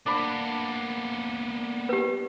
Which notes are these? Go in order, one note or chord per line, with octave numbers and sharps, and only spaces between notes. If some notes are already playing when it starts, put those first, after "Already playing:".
A#3 B3 D4 B5
G4 B4